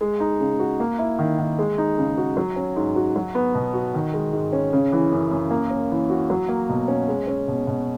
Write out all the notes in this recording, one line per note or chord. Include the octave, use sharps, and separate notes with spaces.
G#3
D#4
C#3
F#4
A#3
E4
D#3
D#3
G#3
D#4
C#3
F#4
F#3
C#4
G#2
F#4
F#3
B3
B2
F#4
D#3
G#3
G#2
C#4
C#3
E3
F#2
F#2
A#3
C#4
E3
F#4
F#3
A#3
B2
C#4
G#3
C#4
B2
B2